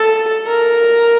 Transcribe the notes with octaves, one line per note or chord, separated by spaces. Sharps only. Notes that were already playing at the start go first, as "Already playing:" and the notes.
Already playing: A4
A#4